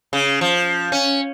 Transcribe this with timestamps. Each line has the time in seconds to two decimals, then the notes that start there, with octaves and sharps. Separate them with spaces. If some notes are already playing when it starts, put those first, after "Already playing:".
0.13 C#3
0.41 F3
0.92 C#4